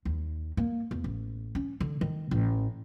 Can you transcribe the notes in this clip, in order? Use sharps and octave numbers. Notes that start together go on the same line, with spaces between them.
D#2
A#3
E2
A1
C#4
D3
D#3
A1